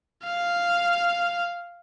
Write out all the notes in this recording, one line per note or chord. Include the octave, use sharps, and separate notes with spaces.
F5